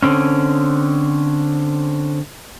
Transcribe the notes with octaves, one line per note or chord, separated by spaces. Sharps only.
D3 C4 C#4